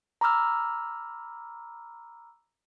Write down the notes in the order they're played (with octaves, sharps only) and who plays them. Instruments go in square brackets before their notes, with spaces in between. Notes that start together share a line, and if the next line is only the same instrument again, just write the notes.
[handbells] A#5 B5 D6 E6 F6